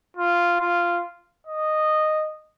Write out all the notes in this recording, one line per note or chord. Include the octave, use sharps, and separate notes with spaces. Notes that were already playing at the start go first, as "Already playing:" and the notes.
F4
F4
D#5